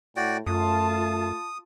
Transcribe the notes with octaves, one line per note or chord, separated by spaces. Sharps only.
A2 F#4 D5 G5
F#2 A3 F4 A5 D#6